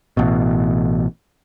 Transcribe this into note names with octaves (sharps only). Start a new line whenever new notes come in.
A1 B2